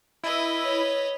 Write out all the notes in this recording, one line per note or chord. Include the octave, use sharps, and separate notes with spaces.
E4 B4 D#5
C#5